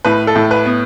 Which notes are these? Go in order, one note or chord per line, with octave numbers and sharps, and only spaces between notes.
A2 B4
A4
A2
B4
B3